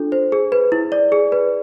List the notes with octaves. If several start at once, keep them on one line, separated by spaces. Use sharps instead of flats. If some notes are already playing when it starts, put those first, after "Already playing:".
Already playing: D4 F4 A4
C5
G#4
B4
E4
D5
G#4
B4